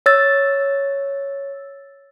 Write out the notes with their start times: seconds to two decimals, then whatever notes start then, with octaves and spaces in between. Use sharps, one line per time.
0.06 C#5 E6 A6